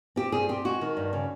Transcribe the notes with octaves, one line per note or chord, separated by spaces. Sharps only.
C4 G4
G2 G#4
C4 G4
G#3 F#4
D#3
G2
C#3